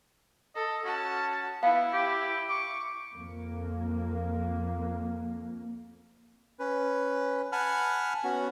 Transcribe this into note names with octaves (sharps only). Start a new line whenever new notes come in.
A4 D#5
C#4 F#4 A5
B3 E4 F5
G4
C#6 D6
F2 A#3
C#4 B4
F#5 G#5 A5 B5 F6
B3 C#4 F#4